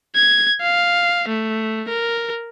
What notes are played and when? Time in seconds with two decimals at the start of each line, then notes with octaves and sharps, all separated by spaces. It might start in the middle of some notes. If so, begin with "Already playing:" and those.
0.15 G#6
0.61 F5
1.28 A3
1.89 A#4